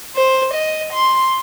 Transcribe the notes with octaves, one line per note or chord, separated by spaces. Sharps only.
C5
D#5
C6